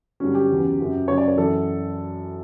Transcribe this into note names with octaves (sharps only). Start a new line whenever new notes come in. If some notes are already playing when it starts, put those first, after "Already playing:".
G2 D3 F#3 C#4
G4
E2 C#3 F#3
F#2 C#3 F#3
F#2 C#3 F#3 C#5
D5
C#5
F#2 E3 A4